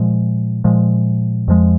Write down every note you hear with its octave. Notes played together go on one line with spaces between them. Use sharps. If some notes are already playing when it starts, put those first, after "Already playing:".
Already playing: A#2 F3 G#3
A#2 F3 G#3
F2 F3 G#3